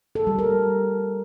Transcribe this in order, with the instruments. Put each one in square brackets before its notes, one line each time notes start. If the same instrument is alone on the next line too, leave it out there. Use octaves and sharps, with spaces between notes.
[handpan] A4
G3
A#4